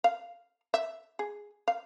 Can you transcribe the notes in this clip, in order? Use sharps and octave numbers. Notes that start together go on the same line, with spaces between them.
F5
E5
G#4
F5